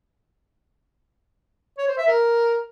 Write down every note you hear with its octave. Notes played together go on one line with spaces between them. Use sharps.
C#5
C5
E5
A#4